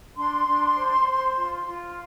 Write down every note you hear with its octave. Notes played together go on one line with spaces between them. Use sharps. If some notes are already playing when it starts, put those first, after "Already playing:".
D4 C6
D4
C5
C5
F4
F4